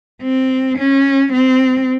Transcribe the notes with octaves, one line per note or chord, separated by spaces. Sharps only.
C4
C#4
C4